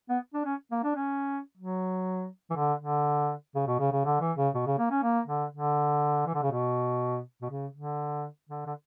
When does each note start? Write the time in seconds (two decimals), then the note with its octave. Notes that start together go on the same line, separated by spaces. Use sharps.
0.09 B3
0.34 D4
0.46 C#4
0.71 A#3
0.84 D4
0.96 C#4
1.57 F#3
2.50 E3
2.56 D3
2.81 D3
3.55 C#3
3.67 B2
3.79 C#3
3.92 C#3
4.05 D3
4.20 E3
4.37 C#3
4.54 B2
4.66 C#3
4.78 A#3
4.91 C#4
5.03 A#3
5.27 D3
5.52 D3
6.26 E3
6.34 D3
6.43 C#3
6.52 B2
7.42 B2
7.50 C#3
7.74 D3
8.49 D3
8.66 D3